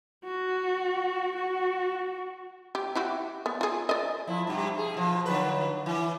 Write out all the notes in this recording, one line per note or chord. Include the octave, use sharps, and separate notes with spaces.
F#4
F#4
G4
E4 F#4 G4
B3
F4 G#4
D5 D#5
F3 E4
G2 C3
B2 G#4
B2 F3
D3 F#3 B4
E3